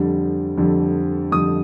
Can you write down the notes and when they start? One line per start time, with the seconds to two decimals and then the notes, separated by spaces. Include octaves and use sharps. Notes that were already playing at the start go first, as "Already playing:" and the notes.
Already playing: F2 D3 G3
0.57 F2 D3 G3
1.32 F2 D3 G3 D#6